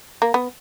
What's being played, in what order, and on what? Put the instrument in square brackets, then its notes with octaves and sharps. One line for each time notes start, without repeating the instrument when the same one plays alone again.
[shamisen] A#3
B3